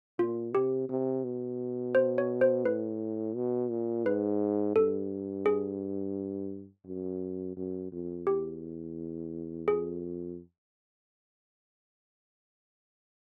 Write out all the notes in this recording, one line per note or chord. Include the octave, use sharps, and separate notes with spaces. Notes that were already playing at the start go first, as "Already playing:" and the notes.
A#2 F4
C3 G4
C3
B2
C5
C#5
C5
A2 B4
B2
A#2
G#2 B4
G2 A4
G#4
F#2
F#2
F2
E2 G4
F2 G#4